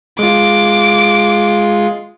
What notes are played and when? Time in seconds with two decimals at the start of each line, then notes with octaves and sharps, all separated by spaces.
0.19 G#3 F4 D6